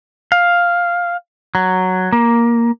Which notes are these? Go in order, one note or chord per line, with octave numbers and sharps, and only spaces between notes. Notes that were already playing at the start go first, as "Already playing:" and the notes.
F5
F#3
A#3